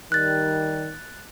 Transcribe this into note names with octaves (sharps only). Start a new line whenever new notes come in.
D#3 G3 F#6 A6